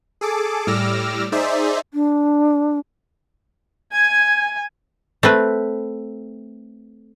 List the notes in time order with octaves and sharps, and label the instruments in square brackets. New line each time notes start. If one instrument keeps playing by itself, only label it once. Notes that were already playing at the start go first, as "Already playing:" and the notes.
[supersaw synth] G#4 A4 D6
A2 G3 D6 E6 F6 A#6
D#4 G#4 C5 D5 E5
[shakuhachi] D4
[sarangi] G#5 [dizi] G#6
[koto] A3 C4 B4